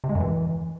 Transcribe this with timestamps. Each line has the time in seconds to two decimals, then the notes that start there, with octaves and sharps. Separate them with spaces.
0.04 C3
0.09 G#3
0.15 F#2
0.21 E3